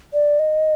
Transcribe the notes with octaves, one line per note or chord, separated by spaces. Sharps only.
D5
D#5